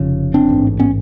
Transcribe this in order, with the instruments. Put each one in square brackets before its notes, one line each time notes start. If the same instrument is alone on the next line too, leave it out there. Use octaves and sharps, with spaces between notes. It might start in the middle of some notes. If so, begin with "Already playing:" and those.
Already playing: [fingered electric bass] F1 F2 C#3
C4 D4
A1 G#2
B3 C#4